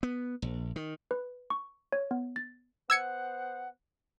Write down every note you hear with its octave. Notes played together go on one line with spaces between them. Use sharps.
B3
A#1
D#3
B4
C#6
C#5
B3
A6
B3 C5 F#5 E6 G#6 C#7